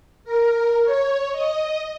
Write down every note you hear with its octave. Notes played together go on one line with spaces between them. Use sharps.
A#4
C#5
D#5